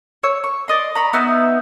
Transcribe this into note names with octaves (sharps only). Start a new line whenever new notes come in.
C#5 E6
C#6
D5 D#5 C6
A#5 B5 C#6
B3 D#4 E5 E6